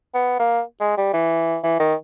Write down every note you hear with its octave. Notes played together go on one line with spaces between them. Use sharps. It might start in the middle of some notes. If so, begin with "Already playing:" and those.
B3
A#3
G#3
G3
E3
E3
D#3